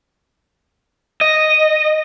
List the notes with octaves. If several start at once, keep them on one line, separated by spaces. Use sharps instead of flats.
D#5